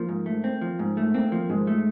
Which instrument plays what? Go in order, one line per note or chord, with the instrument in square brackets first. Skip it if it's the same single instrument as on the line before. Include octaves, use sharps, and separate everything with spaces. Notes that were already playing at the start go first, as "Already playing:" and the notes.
Already playing: [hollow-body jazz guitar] F3 [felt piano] A#3
[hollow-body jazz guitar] G#2
A3
C4
F3
G#2
A3
[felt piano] A#3 [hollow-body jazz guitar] C4
[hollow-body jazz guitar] F3
[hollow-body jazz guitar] G#2 [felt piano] G#3
[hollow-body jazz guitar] A3